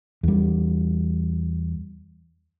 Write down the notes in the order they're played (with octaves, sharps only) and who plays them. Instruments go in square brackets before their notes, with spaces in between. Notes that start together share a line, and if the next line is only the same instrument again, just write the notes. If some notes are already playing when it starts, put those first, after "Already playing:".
[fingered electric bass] E2 G3